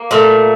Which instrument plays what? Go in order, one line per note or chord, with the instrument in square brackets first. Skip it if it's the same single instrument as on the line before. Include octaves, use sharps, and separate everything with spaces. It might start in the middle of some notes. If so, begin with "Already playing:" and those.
Already playing: [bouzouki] A#3
A#2 A3